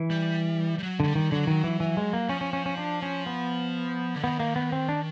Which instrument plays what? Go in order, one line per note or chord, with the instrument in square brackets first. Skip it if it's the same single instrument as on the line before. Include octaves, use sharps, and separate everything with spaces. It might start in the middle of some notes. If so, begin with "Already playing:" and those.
Already playing: [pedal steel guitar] E3
[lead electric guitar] G3
G3
F#3
[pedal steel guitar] D3 [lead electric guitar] F#3
[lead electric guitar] G3
[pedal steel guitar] D#3
[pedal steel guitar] D3 [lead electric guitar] F#3
[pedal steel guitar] D#3
E3
E3
G#3
A#3
[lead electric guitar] F3 [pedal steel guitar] C#4
[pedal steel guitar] C#4
C#4
C#4
D4
C#4
B3
[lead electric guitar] D3
[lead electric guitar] D#3 [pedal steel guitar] B3
[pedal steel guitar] A#3
B3
C4
D4